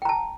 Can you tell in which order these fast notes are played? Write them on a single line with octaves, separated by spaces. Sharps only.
G5 A#5 A5